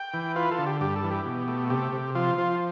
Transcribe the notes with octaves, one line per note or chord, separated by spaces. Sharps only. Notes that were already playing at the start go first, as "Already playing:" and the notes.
Already playing: G5
E3
F4 B4
A4
D3
G4
G2 G4
A4
E3
G4
B2
A3
C3 G4
C3
F3 F4
F3